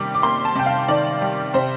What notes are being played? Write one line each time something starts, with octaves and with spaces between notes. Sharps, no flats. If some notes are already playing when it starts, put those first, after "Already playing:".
Already playing: C3 D#3 G3 A#3 D6
D6
A#3 C6
A5
C3 G5
F5
D#3 D5
G3
C3 C5